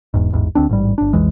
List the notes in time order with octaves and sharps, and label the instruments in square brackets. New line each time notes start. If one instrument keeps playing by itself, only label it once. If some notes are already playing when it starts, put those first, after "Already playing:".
[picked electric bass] E1 E2 G#2
A1 E2 G#2
D2 C4 D4
A1 G#2 G3
G1 D4
B1 F2 E3 G#3